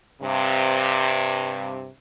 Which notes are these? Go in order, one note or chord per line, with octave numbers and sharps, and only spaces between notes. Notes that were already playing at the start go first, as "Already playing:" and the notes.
G2 C3